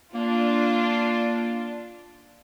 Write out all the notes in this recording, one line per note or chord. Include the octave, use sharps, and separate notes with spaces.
A#3 D4 F4